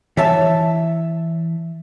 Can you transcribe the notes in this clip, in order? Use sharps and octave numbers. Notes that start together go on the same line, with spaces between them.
E3 C#5 E5 A5